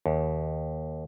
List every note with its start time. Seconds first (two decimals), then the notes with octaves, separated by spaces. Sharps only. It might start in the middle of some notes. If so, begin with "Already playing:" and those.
0.06 D#2